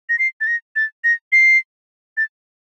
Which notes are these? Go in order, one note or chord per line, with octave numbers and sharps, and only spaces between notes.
A#6
C7
A6
A#6
A6
A#6
C7
A6